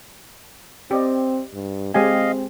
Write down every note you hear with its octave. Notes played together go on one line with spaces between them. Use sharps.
C4 G4 D5 D#5
G2
G#3 C4 G4 D#5 F5 G#5